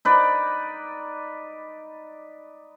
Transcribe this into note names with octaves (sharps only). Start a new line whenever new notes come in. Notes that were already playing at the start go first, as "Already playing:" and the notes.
D#4 B4 D5